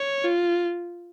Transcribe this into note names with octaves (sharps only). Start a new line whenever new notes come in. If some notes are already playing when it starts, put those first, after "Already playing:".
Already playing: C#5
F4